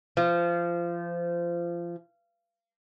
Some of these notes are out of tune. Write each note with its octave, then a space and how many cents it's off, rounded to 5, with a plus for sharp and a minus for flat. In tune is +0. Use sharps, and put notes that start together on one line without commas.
F3 -25